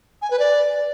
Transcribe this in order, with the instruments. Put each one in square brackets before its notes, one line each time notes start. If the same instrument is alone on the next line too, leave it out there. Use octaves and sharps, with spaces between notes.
[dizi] G#5
B4
D5